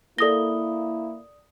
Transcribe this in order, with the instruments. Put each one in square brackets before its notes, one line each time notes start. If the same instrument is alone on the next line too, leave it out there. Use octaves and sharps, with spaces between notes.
[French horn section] A#3 E4 [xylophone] A4 A#6 [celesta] D5 D#6 G7